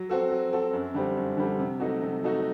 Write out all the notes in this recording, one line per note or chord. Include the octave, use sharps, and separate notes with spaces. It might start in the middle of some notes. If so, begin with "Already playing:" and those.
Already playing: F#3
C4 F#4 A4
F#3
C4 F#4 A4
F#2
D3 G3 C4
F#2
D3 G3 C4
C3
F#3 A3 D#4 F#4
C3
F#3 A3 D#4 F#4